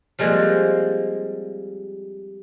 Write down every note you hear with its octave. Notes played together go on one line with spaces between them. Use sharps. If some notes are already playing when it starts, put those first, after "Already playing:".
F3 G3 G#3 A#3 C4